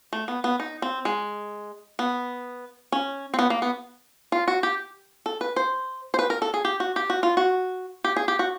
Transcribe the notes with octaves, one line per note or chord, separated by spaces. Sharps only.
A3
B3
B3
D#4
C4
G#3
B3
C#4
C4
B3
A#3
B3
F4
F#4
G4
A4
B4
C5
C5
B4
A#4
A4
G#4
G4
F#4
G4
F#4
F4
F#4
G4
G#4
G4
F#4